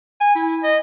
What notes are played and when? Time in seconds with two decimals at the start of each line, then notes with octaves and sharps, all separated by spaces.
0.21 G#5
0.36 E4
0.63 D#5